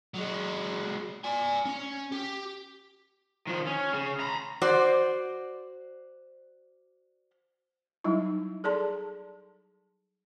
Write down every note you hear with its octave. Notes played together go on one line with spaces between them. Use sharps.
F#3 G#3
D5 G#5
C#4
G4
D#3 F3
C#4
C#3
A#5 B5
F#4 C5 D5
F#3 G3 D#4 E4
G#4 A4 D5 A5 C6